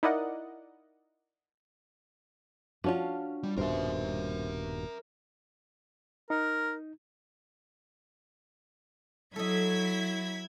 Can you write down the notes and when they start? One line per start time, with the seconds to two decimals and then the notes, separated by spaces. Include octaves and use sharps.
0.03 D#4 E4 A#4 D5 D#5 F#5
2.84 F3 C#4 D4 F4 F#4
3.43 G3
3.58 D#1 G2 B2 A#4 C5 E5
6.30 D#4 A#4
9.36 F#3 E4 A4 D#5 G#6 B6